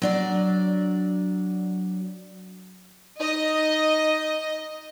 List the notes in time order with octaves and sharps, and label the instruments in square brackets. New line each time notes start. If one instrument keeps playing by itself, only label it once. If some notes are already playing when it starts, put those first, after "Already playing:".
[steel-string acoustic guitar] F#3 D4 D5
[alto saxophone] D#4 [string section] D#5